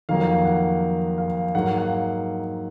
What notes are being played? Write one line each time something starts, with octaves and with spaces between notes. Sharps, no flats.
F2 D#3 F#3 A#3 F5
F#5
F5
G#2 F#3 A#3 F#5
F5
F#5